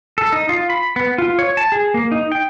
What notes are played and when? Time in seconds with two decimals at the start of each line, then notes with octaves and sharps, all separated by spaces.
0.18 A4
0.32 D#4
0.49 F4
0.70 B5
0.96 B3
1.18 F4
1.39 C#5
1.57 A5
1.72 G#4
1.94 A#3
2.12 D#4
2.32 G5